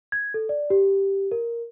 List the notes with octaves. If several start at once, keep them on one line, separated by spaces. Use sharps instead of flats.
G#6
A4
D5
G4
A#4